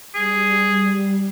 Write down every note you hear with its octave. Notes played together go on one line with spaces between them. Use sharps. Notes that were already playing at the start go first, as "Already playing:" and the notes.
G3 G#4